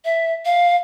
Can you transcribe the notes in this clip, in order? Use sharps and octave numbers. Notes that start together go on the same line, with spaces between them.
E5
F5